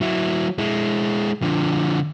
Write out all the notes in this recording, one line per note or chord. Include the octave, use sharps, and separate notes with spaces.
F#3 E4
G#3 E4
D3 F3